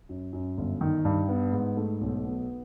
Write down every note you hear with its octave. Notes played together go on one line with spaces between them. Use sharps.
F#2
F#2
G1
D#3
G2
B3
G#2
A3
B1
B3